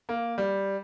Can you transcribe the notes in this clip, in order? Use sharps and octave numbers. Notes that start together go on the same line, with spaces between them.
A#3
G3